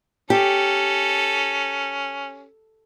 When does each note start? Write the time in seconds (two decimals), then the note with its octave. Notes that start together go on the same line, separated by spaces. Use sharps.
0.30 C#4 G4 A4